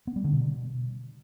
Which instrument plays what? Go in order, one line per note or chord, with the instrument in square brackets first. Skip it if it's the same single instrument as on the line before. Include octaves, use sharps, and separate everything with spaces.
[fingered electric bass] B3
G3
D3
B2